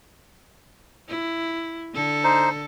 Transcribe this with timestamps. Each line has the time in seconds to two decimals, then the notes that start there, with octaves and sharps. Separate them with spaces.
1.08 E4
1.94 D3 A4
2.24 D#4 C5